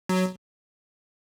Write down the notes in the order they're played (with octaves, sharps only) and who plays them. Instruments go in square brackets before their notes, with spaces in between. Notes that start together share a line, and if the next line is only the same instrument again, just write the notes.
[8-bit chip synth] F#3